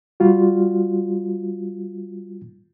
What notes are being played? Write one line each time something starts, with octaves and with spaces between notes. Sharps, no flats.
G3 F4 F#4